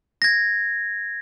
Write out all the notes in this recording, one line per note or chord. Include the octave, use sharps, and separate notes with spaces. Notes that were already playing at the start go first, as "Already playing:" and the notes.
G#6 A#6